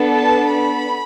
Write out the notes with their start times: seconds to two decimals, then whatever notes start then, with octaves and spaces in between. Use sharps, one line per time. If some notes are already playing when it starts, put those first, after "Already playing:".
Already playing: B3 D4 A4
0.15 A5
0.52 B5